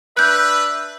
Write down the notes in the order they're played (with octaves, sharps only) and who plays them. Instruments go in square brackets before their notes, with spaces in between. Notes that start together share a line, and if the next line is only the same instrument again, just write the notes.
[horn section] D4 B4 [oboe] E5 [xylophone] F#6 G6